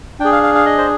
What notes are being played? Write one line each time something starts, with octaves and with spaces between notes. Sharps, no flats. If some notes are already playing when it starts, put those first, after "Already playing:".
D4 G#4 G5
F5
F5
F5
D#5
C5